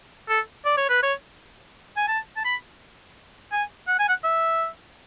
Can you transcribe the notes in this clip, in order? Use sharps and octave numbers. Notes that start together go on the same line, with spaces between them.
A4
D5
C#5
B4
C#5
G#5
A5
A5
B5
G#5
F#5
G#5
F#5
E5